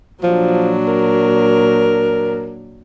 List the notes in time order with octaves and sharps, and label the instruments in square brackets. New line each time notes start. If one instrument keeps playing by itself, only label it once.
[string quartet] A#2 F#3 D4 [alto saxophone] F3
[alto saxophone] A#4